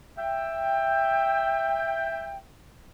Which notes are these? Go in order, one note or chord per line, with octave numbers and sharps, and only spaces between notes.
E5 G5